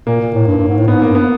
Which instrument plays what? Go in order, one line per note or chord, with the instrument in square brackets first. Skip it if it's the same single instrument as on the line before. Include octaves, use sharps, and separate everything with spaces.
[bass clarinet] A#2 [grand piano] A#3
[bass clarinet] A#2
A2
G2
G2
G#2
A2
[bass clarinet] G#2 [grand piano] B3
[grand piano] A#3
[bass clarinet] G2
[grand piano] B3